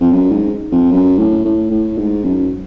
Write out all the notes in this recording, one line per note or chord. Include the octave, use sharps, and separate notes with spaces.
F2
F#2
G#2
F2
F#2
A2
A2
A2
G#2
F#2